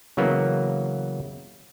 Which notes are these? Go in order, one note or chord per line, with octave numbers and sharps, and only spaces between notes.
C#3 E3 F#3 A#3 B3